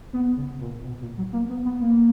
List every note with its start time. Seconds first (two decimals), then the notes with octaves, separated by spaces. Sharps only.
0.13 B3
0.37 C#3
0.61 A#2
0.85 B2
1.01 A#2
1.18 F#3
1.33 A#3
1.49 B3
1.65 B3
1.81 A#3